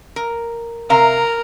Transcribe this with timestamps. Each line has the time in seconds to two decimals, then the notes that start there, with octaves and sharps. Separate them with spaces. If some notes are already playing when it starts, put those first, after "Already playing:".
0.16 A#4
0.90 C3 A#4 F5 A#5